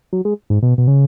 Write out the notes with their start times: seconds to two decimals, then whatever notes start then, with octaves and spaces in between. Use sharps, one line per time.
0.13 F#3
0.25 G#3
0.50 G#2
0.63 B2
0.78 B2
0.88 C#3